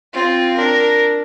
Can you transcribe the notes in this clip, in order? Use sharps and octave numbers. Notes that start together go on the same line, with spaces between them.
C4 F4
D4 A#4